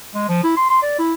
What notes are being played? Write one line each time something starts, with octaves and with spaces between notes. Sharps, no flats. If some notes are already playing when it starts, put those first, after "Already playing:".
G#3
F3
E4
C6
C6
D5
E4